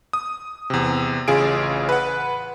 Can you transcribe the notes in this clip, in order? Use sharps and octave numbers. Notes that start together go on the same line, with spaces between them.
D#6
E2 C3
A1 C#3 F4 G#4 D7
B4 F#5